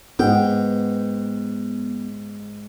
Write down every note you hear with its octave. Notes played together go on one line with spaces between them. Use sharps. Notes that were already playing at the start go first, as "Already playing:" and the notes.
G#2 B3 G5